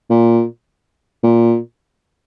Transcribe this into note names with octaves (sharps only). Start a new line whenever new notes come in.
A#2
A#2